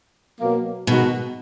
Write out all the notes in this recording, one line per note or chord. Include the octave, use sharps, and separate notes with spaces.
B2 F#3 A#3
B2 D#3 G#3 D#4 F#4